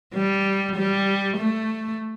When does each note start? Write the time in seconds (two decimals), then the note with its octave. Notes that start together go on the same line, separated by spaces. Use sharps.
0.14 G3
0.75 G3
1.37 A3